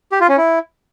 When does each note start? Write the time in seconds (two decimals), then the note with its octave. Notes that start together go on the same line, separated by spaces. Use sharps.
0.12 G4
0.21 F4
0.29 C#4
0.38 E4